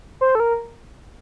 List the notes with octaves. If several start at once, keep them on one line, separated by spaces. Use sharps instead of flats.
C5
A4
A#4